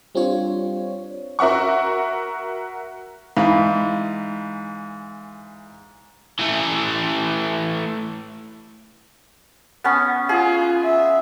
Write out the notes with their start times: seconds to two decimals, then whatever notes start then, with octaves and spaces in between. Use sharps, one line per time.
0.15 G3 C4 D4 F4 C#5
1.39 F#4 A#4 E5 F#5 C#6
3.37 G#2 E3 F5 B5
6.39 E3 A3
9.84 B3 C#4
10.29 F4 G#4
10.84 E5